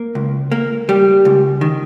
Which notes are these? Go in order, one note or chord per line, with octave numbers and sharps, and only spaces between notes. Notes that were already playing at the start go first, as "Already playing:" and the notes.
Already playing: A#3
C#2
A#3
G3
C#2
D#3